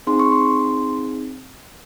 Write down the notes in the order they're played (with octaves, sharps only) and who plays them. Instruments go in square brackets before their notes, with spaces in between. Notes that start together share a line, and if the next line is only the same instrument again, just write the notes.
[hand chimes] C4 D#4 G#4 C6
C#6
C6